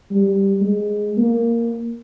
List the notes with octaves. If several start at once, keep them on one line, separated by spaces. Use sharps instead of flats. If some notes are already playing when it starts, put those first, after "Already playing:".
G3
G#3
A#3